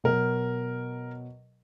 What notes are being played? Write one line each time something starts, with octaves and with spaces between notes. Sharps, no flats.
B2 F#3 A#4